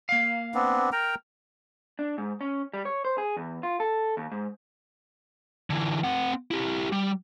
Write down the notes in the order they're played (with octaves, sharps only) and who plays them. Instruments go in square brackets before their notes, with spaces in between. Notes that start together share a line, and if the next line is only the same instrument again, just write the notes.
[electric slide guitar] A#3 F5
[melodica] B3 C4 D4
A#4 G5 A#5
[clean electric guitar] D4
G#2
C#4
G3
C#5
C5
G#4
E2
F4
A4
D#2
G#2
[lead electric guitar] D3 E3
C4 F#5
E4 G4
G3